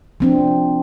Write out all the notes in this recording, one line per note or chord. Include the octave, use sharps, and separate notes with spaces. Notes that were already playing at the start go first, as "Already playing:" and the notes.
F3 C4 D4